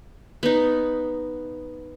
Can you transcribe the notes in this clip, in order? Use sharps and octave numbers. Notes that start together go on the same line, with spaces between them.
B3 D#4